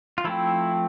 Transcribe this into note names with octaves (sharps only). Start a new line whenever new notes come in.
F4
F3 A3 C4 E4